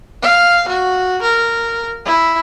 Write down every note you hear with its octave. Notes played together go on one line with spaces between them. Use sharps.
F5
F#4
A#4
E4